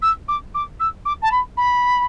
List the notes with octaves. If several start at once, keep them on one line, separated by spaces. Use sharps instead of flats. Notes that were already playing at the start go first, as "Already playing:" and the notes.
E6
D6
D6
E6
D6
A5
B5
B5